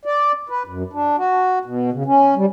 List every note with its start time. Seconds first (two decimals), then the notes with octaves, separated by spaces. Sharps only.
0.05 D5
0.49 B4
0.67 F#2
0.93 D4
1.18 F#4
1.65 B2
1.93 C#3
2.06 C#4
2.36 G3